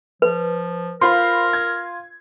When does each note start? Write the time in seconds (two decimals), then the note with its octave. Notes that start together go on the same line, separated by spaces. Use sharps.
0.22 F3 B4
1.01 F4 A#4 C5 F5 B5 C6
1.53 G#6